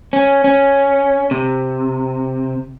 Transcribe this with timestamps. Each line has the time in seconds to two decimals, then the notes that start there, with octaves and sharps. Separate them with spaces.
0.13 C#4
0.44 C#4
1.31 C3